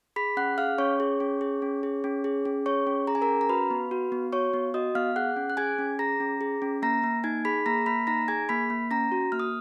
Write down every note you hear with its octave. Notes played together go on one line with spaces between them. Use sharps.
G#4 B5 B6
C#4 F#5 F#6
G#4 F5 F6
C#4 C#5 C#6
G#4
C#4
G#4
C#4
G#4
C#4
G#4
C#4
G#4 C#5 C#6
C#4
G#4 A#5
G#5
A#4 A#5
C#4
A#5
F#4 B4 B5
B3
F#4
B3
F#4 C#5 C#6
B3
F#4 D#5 D#6
B3 F5 F6
G#4 F#5 F#6
C#4
F#6
G#4 G#5 G#6
C#4
G#4 A#5 A#6
C#4
G#4
C#4
A#3 A#5 A#6
A#3
D#4 G#5 G#6
G#4 B5 B6
A#3 A#5 A#6
A#3 B5 B6
D#4 A#5 A#6
G#4 G#5 G#6
A#3 B5 B6
A#3
C#4 A#5 A#6
F#4
A#3 F6
D#6